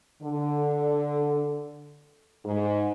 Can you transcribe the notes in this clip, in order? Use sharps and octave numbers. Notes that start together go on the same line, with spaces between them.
D3
G#2